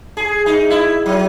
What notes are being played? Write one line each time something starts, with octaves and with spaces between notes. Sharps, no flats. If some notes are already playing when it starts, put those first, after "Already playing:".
G#4
D#4
E4
F#3